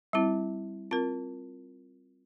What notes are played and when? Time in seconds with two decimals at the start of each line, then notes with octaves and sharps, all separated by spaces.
0.13 G3 C4 E4
0.91 C4 F4 A#4